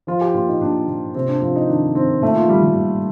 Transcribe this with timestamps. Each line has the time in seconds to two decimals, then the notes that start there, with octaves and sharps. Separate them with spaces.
0.07 F3 F4
0.21 G4
0.34 A#2 F4
0.48 D#4
0.61 A#2 D4
0.87 A#2
1.15 C3 C4
1.28 D4
1.42 F2 F4
1.56 D#4
1.68 D#3 D4
1.95 D#3 C4
2.22 A#2 A3
2.36 F4
2.48 A#2 G3
2.63 G3
2.75 A#2